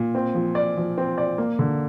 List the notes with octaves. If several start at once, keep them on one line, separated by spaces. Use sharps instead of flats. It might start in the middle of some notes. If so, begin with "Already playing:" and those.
Already playing: A#2
C4
F3
D5
F3
C4
D5
A#3
D3